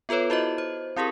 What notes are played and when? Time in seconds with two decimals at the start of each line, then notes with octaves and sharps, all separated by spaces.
0.09 B3 F4 A4 B4 C#5
0.30 E4 F#4 C5 D#5
0.58 C5
0.96 C4 E4 G4 G#4 A#4